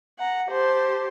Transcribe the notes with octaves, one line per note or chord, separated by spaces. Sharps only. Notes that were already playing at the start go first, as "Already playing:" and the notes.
F#5 A#5
G4 C5 A5